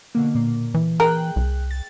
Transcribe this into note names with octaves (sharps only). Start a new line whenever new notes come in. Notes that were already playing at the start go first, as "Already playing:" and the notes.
B2 D3 A#3
A#2 A#3
E3
G#4 A#4 G5 F#6
C2
A6